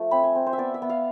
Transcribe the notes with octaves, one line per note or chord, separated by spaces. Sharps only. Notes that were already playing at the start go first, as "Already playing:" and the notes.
Already playing: F3 A3
C4 B5
G#5
C4
C5
E5
B3 D5
E5
B3
F5